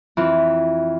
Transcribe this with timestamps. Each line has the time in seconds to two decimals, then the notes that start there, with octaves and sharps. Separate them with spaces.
0.17 F2 E3 C4 E4